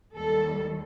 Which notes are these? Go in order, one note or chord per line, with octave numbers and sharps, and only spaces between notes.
D#2 D#3 G3 A4